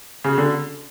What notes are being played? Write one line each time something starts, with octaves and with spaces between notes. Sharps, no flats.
C#3
D3